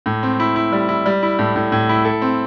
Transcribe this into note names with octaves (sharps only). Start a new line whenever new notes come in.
A2
C4
E4
E4
G3
E4
G3
E4
A2
A2
A2
E4
A4
C4